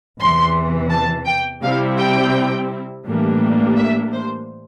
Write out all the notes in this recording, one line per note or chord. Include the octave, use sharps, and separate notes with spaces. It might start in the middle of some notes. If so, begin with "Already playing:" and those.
E2 C3 E3 C6
A5
G5
C3 G3 C4 E4 F5
G5
A2 E3 G3 A#3 D4
E5
C5